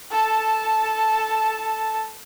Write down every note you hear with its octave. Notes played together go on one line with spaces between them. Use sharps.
A4 A5